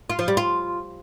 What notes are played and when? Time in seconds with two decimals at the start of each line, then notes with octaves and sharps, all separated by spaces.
0.10 F4
0.19 F3
0.28 G3
0.37 F4